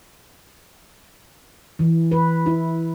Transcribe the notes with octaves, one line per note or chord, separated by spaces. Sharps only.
E3
B4
E4